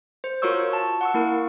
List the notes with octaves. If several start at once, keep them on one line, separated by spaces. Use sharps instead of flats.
C5
F4 F#4 A#4 C#5 C#6 E6
A5
F#5 C#6 E6
A#3 E4 A#4